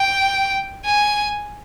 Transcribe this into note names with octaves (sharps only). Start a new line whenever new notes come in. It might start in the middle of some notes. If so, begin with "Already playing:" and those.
Already playing: G5
G#5